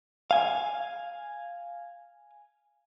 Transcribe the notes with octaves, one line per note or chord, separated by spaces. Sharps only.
F5 G#5